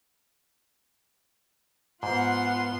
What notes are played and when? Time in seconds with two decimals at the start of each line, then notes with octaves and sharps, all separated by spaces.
2.03 G#2 B3 F4 F#5 C6